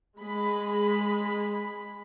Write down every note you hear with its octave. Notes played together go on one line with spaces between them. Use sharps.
G#3 B5